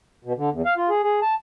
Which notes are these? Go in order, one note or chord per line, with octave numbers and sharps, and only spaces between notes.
B2
D3
E2
F5
F4
G#4
G#4
A5